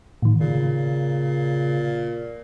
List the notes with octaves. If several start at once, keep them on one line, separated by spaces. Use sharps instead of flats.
A2 D#3
A#2 C#3